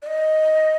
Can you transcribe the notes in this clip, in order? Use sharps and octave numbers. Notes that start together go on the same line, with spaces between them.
D5
D#5